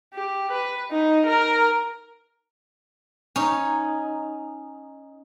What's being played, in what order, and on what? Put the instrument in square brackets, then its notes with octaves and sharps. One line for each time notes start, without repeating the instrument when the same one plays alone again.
[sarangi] G4
B4
D#4
A#4
[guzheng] C#4 D#4